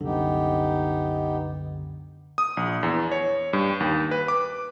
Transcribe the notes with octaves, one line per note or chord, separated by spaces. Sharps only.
C2 F#2 D3 B3 D#4 G4
D#6
A#1
E2
C#5
G2
D#2
B4
D6